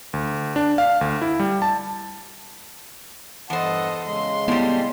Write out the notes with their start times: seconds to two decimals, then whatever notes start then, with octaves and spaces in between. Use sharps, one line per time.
0.13 D2
0.56 D4
0.78 F5
1.01 D2
1.22 E4
1.39 G3
1.62 A5
3.50 E2 G2 A4 C5 D#5 F#5 A5
4.03 C#3 G#3 C6
4.48 A2 G3 B3